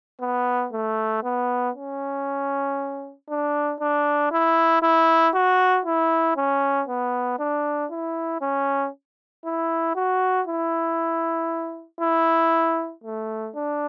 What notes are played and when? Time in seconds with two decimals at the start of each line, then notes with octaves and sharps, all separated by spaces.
0.21 B3
0.73 A3
1.24 B3
1.75 C#4
3.29 D4
3.81 D4
4.32 E4
4.83 E4
5.34 F#4
5.86 E4
6.37 C#4
6.88 B3
7.40 D4
7.91 E4
8.42 C#4
9.45 E4
9.95 F#4
10.47 E4
12.01 E4
13.04 A3
13.55 D4